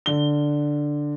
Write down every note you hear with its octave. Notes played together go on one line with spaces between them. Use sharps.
D3 G7